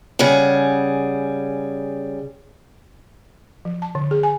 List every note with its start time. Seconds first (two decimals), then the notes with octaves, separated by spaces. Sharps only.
0.19 C#3 G3 G#4 F#5
3.65 F3
3.82 A5
3.95 D3
4.11 G#4
4.23 G#5